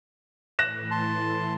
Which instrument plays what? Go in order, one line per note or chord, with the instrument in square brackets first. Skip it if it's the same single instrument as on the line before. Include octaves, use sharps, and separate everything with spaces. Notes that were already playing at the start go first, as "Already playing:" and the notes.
[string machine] A2 E3 [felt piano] F#6 A#6 E7
[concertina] A5 C6